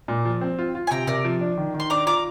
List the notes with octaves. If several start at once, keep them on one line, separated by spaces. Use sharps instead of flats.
A#2
F3
C4
F4
F4
G#5
C3 G5 A#5
C3 A#4 D5
F3
D4
D#3
D#3
C6
D4 A#5 D6
F4 A#5 D6